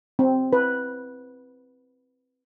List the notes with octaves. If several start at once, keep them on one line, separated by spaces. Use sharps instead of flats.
C4
B4